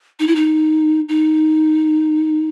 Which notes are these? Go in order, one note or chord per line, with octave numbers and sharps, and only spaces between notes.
D#4
E4
D#4
D#4